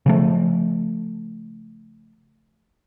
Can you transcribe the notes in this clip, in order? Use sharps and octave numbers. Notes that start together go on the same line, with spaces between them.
C#3 F3 A3